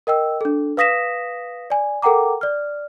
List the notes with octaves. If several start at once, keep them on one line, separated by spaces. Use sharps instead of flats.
A#4 D#5 G5 E6
D4 A4
B4 F5 D#6 A#6 B6 E7
D5 G#5
A4 A#4 F#5 G5 A#5 D6
D5 F6